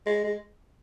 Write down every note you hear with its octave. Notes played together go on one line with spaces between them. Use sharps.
G#3
G#3